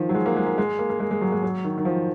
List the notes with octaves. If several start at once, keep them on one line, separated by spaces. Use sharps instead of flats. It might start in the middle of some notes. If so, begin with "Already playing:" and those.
Already playing: D#3 F3
F#3
G#3
A#3
G#3
A#3
G#3
A#3
A#3
G#3
G#3
F#3
G#3
F#3
D#3
D#3
F3